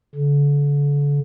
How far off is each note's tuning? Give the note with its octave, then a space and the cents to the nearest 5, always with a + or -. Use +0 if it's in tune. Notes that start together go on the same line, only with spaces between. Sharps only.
D3 -35